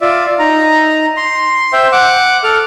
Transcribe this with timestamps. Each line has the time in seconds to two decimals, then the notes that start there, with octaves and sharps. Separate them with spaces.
0.01 F4 D5 E5
0.39 D#4 A#5
1.17 C6
1.73 C5 E5 G5
1.92 F#5 D6
2.44 A4 F6